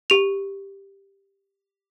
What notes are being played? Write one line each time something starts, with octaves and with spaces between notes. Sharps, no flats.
G4 F7